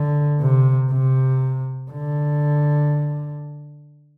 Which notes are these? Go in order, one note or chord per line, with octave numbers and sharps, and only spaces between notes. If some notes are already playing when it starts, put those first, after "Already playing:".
Already playing: D3
C3
C3
D3